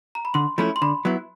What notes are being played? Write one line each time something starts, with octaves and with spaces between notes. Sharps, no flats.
A#5
B5
D3 C6
F3 A3 C#4 E4 B5
C6
D3 B5
F#3 B3 E4